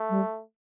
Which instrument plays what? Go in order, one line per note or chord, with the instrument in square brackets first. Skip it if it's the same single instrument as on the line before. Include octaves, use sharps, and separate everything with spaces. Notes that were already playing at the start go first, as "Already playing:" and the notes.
Already playing: [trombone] A3
[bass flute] G3